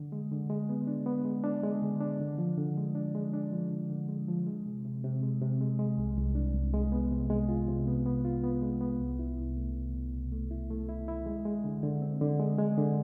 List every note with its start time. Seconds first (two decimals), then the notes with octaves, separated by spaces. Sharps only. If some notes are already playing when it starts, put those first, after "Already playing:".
Already playing: D3
0.12 G#3
0.32 D3
0.50 G#3
0.69 B3
0.87 D4
1.06 B3
1.25 G#3
1.44 D4
1.63 G#3
1.82 D3
2.01 D4
2.20 D3
2.38 F3
2.58 D3
2.77 G#3
2.95 D4
3.15 G#3
3.33 D4
3.52 F3
3.71 D3
3.90 D3
4.09 G#3
4.28 F3
4.47 G#3
4.66 C3
4.85 C3
5.04 C3
5.22 G#3
5.41 C3
5.61 G#3
5.79 G#3
5.98 C2
6.17 C2
6.35 D4
6.55 C2
6.74 G#3
6.92 B3
7.12 C3
7.30 G#3
7.49 F4
7.68 C3
7.87 B3
8.06 B3
8.25 F4
8.43 B3
8.62 G#3
8.81 B3
9.00 C2
9.19 E4
9.38 C2
9.57 A3
9.76 C2
9.95 B2
10.14 C2
10.32 A3
10.51 E4
10.70 A3
10.89 E4
11.08 E4
11.26 G#3
11.45 G#3
11.64 D3
11.83 D3
12.02 C4
12.21 D3
12.40 G#3
12.59 G#3
12.78 D3